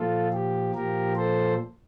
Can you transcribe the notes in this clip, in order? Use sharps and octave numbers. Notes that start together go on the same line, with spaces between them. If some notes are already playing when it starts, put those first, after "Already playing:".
Already playing: A#2 F3 F4 A4
G4
A#2 F3 G4 A#4
A4 C5